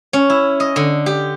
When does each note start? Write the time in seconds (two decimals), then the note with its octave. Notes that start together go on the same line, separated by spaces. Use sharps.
0.13 C#4
0.30 E4
0.60 D#5
0.76 D3
1.06 G4